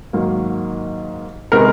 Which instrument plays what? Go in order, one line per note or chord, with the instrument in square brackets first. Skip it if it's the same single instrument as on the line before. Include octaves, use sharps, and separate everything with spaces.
[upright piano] G#2 D#3 F#3 A#3
C3 D#3 G#3 B3 A#4